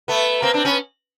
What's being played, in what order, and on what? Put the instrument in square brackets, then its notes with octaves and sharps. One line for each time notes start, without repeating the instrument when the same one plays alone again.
[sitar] A3 B3
A#3 C4
C4 D4
B3 C#4